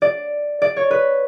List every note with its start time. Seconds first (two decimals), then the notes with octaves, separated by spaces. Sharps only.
0.02 D5
0.62 D5
0.77 C#5
0.91 B4